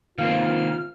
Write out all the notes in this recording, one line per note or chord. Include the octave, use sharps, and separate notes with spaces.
D#3 A#3 C4 F4 F5 F6